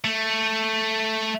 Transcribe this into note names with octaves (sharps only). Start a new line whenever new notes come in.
A3